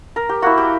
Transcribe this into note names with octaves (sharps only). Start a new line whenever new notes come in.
A#4
G4
A#3 E4 F#4
G4